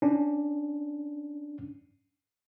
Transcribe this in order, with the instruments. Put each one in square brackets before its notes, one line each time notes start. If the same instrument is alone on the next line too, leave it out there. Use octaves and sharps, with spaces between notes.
[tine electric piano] C#4 D4